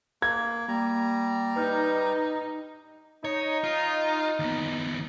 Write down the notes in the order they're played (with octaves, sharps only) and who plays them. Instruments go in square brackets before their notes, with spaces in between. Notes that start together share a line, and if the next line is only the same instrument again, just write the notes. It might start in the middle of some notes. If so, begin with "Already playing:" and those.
[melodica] A#3 [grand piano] G#6
[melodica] G3 A#5 [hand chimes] A#3
[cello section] D#4 [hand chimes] B4 F6 G6
[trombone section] D#4 [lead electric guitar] C#5
[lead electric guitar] F4
D#2 B3